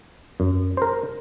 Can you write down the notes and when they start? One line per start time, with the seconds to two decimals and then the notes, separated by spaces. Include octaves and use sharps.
0.40 F#2
0.77 A#4 C5